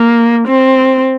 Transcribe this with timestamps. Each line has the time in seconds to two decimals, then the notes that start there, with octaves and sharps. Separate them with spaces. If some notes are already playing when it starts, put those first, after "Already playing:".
Already playing: A#3
0.48 C4